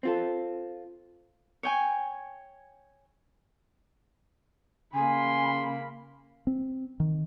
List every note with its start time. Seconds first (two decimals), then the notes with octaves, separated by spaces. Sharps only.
0.03 C4 F4 A4
1.63 C#5 G5 G#5
4.95 C#3 A#3 G#5 B5 C6
6.47 C4
7.00 D#3